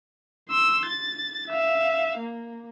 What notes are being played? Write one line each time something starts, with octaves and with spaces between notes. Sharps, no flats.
C6 E6
A6
E5 F5
A#3